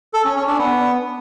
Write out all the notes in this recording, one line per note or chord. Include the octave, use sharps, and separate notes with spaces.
A4
C#4
C#4
D4
B3